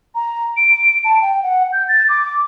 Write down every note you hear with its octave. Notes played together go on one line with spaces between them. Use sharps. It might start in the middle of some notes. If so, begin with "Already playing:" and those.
A#5
D7
A5
G5
F#5
G6
A6
D6